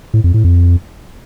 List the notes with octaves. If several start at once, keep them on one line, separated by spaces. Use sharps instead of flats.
A2
F2
A2
F2